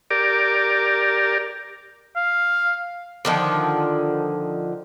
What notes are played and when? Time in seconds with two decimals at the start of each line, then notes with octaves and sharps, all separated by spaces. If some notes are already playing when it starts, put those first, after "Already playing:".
0.10 G4 A#4 D5
2.16 F5
3.25 D3 D#3 F3